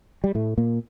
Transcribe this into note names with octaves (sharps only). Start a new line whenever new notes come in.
G3
A2 A3
A#2 A#3